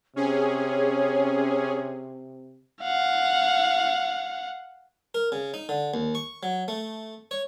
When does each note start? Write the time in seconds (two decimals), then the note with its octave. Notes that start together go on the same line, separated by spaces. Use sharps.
0.16 C3 C#4 G#4 C#5
2.82 F5 F#5
5.14 A#4
5.32 C#3
5.54 D#4
5.69 D3
5.94 D#2
6.15 C#6
6.43 F#3
6.68 A3
7.31 C#5